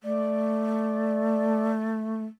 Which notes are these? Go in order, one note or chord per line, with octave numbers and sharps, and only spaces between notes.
A3 D5